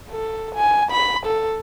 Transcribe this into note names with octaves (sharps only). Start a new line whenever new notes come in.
A4
G#5
B5
A4